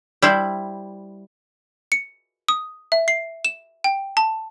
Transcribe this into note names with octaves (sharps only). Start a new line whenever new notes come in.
G3 E4 C5
C#7
D#6
E5
C7
E7
G5
A5